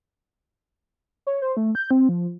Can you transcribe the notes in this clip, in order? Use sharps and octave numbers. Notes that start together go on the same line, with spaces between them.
C#5
C5
A3
G6
C4
F3